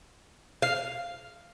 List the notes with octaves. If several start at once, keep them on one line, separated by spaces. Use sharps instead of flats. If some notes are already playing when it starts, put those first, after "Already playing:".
F5